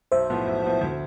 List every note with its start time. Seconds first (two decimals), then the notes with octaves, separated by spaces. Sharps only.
0.12 B1 C5 E5
0.30 A2 F3 B3
0.47 B1
0.64 A2 F3 B3
0.81 D2